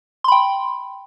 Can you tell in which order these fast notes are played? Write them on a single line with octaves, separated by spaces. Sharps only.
C6 B5 G5